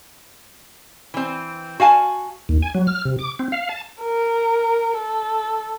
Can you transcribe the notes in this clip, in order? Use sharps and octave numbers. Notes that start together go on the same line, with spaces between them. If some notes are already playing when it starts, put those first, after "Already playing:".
E3 C4
F#4 F5 G#5 A5
D#2
G#5
F#3
F6
C3
D6
C4
F5
A5
A#4
A4